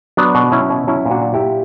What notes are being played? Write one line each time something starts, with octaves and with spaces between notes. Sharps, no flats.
F#3 B3 D4
B2
F#3 C#4 E4
B2
F#3 C#4 E4
A#2
D4 F#4
F#3
E4 G4
A#2